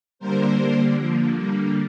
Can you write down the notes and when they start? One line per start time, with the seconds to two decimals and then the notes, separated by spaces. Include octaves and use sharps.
0.19 D3 G3 A#3 A#4 C5
0.58 D3 G3 A#3
0.97 D3 F3 A#3
1.35 D3 G3 A#3